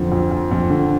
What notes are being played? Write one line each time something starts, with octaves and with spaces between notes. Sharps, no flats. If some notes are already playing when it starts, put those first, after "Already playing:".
Already playing: F2 D3
F2
F2
F2
D3